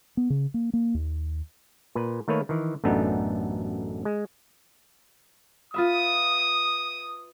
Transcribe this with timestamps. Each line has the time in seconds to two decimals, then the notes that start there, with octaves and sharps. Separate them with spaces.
0.17 B3
0.30 C#3
0.54 A#3
0.73 A#3
0.94 D#2
1.95 A#2 B4
2.28 D#3 A3 A#3 B4 C#5
2.49 D#3 E3
2.84 A1 F#2 A3 B3 D4 D#4
4.05 G#3
5.74 F4 B4 E5 D#6